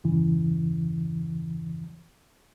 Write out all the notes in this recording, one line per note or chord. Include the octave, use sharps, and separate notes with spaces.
E2 G2 C#3 E3